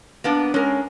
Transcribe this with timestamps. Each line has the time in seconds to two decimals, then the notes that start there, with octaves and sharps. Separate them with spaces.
0.24 A#3 B3 D4
0.54 G#3 C#4 A#4